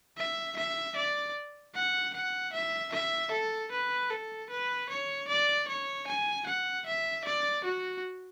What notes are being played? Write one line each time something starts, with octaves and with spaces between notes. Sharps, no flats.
E5
E5
D5
F#5
F#5
E5
E5
A4
B4
A4
B4
C#5
D5
C#5
G#5
F#5
E5
D5
F#4